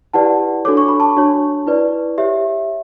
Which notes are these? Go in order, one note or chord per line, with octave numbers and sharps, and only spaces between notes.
E4 G4 B4 D5 F#5 A5
D4 F#4 A4 C#5 D6
C#6
B5
A5 C#6
D4 F#4 C#5
E4 B4 D5
G4 C#5 E5